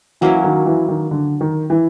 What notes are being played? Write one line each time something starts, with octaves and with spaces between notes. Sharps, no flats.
E3 F#3 A#3 C#4 E4
D#3
E3
D#3
D3
D#3
E3